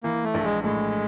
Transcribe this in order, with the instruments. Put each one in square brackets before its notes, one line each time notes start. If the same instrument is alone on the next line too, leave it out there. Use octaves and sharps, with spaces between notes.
[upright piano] E3 [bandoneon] A#3
[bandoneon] A3
[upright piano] A#1
[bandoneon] G#3
[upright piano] A2 [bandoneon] G#3